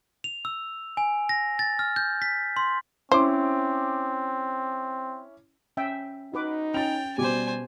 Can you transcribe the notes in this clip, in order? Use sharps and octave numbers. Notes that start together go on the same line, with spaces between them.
F7
E6
G#5
A#6
A6
F6
G6
B6
C6
C4 C#4 E4 C5 D6
C#4 E5 G5
D#4 F#4 B4 D6
C#4 G5 A6 F7
B2 G3 G4 C5 G#5 D6